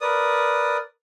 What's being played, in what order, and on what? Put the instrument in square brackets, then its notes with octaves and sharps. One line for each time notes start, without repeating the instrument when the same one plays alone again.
[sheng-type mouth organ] A#4 B4 D5 D#6